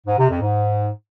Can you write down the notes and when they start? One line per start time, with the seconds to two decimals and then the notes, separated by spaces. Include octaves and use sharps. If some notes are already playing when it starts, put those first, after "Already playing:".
0.06 G#2
0.18 C3
0.29 F2
0.41 G#2